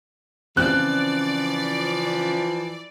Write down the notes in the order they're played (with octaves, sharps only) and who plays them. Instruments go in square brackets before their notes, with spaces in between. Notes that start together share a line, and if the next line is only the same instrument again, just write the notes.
[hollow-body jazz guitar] C#3 C4 [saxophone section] E3 F3 [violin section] D5 [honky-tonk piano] F#6